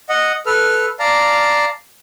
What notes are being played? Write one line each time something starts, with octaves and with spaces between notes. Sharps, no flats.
D#5 F#5
A4 B4 F6
D5 F5 A5 A#5 F6